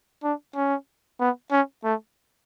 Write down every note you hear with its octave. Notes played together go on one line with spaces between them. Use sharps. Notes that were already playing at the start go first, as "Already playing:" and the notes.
D4
C#4
B3
C#4
A3